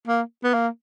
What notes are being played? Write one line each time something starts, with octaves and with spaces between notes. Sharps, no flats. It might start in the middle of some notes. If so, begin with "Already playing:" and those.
A#3
B3
A#3